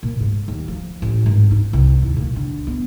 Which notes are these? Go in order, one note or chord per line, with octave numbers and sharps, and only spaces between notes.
A#2
G#2
D#2
F3
A1
G#1
D#4
C2
D#2
A#2
D3
B3